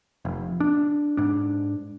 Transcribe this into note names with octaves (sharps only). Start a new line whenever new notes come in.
F1
D4
G#2 D4